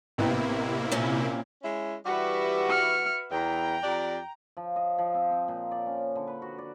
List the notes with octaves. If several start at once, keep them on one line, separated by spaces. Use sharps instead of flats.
A1 C3 A#3 B3 E4 G5
A#2 C4 C#4
G#3 C#4 E4
E3 G3 F#4 G4 B4 E5
F6 C#7
E2 G5 A#5
F2 G4 D5
F3
D#5
F3
C4
C4
A#2
D5
C#4
D3
B4
F#4
D5